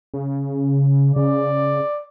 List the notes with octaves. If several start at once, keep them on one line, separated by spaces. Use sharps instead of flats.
C#3
C#3 D5